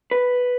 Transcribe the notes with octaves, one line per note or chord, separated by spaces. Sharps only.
B4